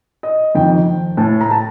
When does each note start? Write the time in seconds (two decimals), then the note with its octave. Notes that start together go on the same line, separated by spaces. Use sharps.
0.23 D#5
0.55 F2 D#3 G5
1.17 A2 A5
1.41 A#5
1.51 A5